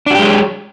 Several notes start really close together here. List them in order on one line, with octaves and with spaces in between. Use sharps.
D4 F#4 G4 G#3 F#3